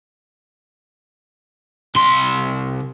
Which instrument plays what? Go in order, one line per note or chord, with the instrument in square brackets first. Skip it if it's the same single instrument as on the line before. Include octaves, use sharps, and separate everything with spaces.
[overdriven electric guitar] C2 C6